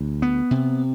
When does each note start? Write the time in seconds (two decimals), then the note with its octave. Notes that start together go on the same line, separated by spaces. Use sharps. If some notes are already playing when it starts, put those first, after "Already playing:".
Already playing: D2
0.22 B3
0.51 C3